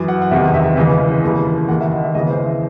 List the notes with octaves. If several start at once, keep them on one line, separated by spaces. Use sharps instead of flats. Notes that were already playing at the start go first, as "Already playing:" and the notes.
Already playing: F#2 E3
F#5
F#5
E2 C3 D#3 E5
E5
C#2 C#3 E3 D#5
D#2 C#3 E3
D#2 D#3 F#5
E5
D#5
E5
C#2 C#3 E3 D#5
C5
E5